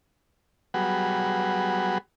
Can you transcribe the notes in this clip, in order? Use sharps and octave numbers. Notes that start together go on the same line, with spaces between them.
F#3 G3 B3 F#4 G#4